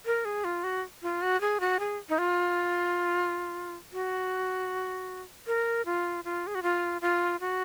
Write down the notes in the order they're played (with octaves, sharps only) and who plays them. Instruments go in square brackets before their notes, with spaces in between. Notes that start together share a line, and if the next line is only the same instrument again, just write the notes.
[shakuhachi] A#4
G#4
F4
F#4
F4
F#4
G#4
F#4
G#4
D#4
F4
F#4
A#4
F4
F4
G#4
F#4
F4
F4
F#4